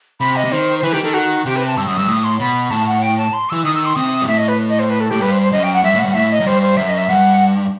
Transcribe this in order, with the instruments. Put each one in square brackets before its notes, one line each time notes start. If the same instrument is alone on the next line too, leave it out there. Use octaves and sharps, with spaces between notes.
[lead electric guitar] C3 [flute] B5
[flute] D#5
[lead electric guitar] C3
[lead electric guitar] D#3 [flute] C5
[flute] C5
[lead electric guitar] E3 [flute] B4
[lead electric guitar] D#3 [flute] G4
[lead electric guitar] D#3 [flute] A4
[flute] F#4
[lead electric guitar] C3 [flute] G4
[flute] B4
A5
[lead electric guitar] G2 [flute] E6
[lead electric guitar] F#2 [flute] D#6
[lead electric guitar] G2 [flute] E6
[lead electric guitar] A2 [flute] D#6
[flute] C6
[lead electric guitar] B2 [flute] B5
[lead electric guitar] A2 [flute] A5
[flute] F#5
G5
A5
C6
[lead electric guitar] E3 [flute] E6
[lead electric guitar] D#3 [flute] D#6
[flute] E6
C6
[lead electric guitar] C3 [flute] D#6
[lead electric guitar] G2
[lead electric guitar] A2 [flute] E5
[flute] D#5
B4
D#5
C5
B4
A4
[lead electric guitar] A2 [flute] G4
[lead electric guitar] G2 [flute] B4
[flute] C5
C5
[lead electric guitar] F#2 [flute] D#5
[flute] G5
F#5
[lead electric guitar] G2 [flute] E5
[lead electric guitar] A2
[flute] F#5
[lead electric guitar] G2
[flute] F#5
[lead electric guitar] A2 [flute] E5
[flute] D#5
[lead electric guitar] F#2
[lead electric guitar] G2 [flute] C5
[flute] C5
[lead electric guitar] F#2 [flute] E5
[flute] D#5
E5
[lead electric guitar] G2 [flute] F#5